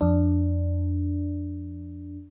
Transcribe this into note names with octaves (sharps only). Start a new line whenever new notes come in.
F2 D4